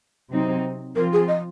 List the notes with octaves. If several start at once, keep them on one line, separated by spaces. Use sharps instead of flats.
C3 F#3 C4 D#4
F3 C4 F4 A#4
G#4
D#5